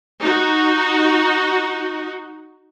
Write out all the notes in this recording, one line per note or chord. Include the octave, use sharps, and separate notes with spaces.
D#4 F#4